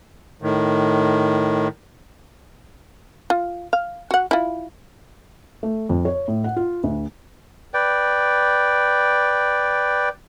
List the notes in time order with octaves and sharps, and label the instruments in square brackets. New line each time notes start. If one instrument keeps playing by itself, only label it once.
[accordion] A2 D#3
[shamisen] F4
F5
F#4 F#5
E4 F4
[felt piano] A3
F2
C#5
A2
F#5
F4
D2
[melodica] B4 D5 G5